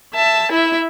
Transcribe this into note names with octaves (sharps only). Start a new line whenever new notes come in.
E5 A5
E4 E5